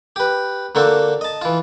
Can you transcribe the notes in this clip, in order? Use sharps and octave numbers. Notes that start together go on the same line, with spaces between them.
G4 B4
D3 A#3 F#4 A4 C5
D#5 A5
E3 F4